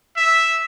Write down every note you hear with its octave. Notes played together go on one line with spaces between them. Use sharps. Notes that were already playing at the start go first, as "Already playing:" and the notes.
E5